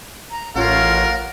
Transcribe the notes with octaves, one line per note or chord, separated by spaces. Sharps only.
A#5
A1 F4 A#4 C#5 F5 F#5